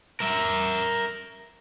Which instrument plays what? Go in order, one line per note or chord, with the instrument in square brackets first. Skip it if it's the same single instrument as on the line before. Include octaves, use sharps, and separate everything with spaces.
[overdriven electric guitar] A#4 E5